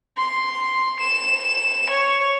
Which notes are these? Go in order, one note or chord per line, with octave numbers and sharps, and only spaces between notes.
C6
E7
C#5